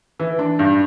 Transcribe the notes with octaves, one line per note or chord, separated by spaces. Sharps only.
E3
D4
G2